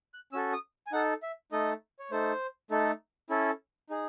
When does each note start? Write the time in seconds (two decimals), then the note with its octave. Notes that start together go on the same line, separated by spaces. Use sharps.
0.14 F#6
0.32 C#4 E6
0.35 F#4 A4
0.53 D#6
0.87 G#5
0.92 D#4 A4 F#5
1.23 E5
1.52 A3 D#4 A4 D#5
1.99 C#5
2.11 A3 D#4 A4 C5
2.71 A3 D#4 A4
3.30 C#4 E4 A4
3.90 D#4 G#4